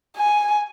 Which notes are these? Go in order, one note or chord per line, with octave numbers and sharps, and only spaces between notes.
G#5